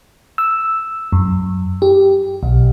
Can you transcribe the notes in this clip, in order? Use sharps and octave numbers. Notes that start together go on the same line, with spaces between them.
E6
F#2
G4
B1